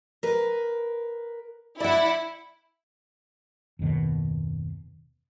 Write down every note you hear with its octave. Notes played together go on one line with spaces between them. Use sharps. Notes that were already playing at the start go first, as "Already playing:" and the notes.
A#4 B4
E4 D5 F#5
F#1 D#2 B2 D#3